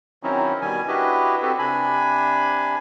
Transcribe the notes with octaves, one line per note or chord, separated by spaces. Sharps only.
D#3 F#3 C4 C#4 D#4 E4
B2 D#3 G3 G#5
D4 E4 F#4 G4 B4 D#5
C4 F#4 G4 A4 B4
C3 D4 G#5 B5